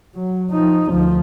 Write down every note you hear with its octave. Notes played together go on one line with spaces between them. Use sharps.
F#3
F3 D#4
D2 F3